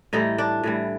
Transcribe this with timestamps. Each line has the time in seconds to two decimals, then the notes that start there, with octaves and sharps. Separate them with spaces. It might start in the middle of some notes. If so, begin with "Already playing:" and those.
0.13 A2 E3 G3 D#4
0.38 D4
0.63 A2 E3 G3